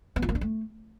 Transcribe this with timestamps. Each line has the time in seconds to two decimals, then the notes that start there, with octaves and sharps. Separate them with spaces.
0.16 B3
0.22 F4
0.29 A#3
0.35 D4
0.41 A3